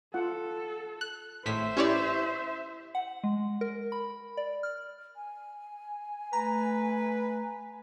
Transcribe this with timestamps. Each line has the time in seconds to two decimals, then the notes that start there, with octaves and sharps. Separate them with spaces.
0.14 F4 A4 F#5
1.01 F#6
1.46 G#1 A2 C5 E5 B6
1.77 C#4 E4 G4 C#5 D5
2.95 F#5
3.24 G#3
3.61 A#4
3.92 B5
4.37 D5
4.63 F6
5.16 G#5
6.33 A3 B4 A#5